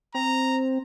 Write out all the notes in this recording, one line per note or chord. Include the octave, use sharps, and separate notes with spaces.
C4 A#5